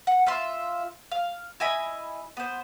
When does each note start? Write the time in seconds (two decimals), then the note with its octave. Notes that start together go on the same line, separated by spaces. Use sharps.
0.07 F#5
0.26 F4 E5 F5 C6
1.11 F5
1.60 E4 D#5 G#5 B5
2.37 B3 C5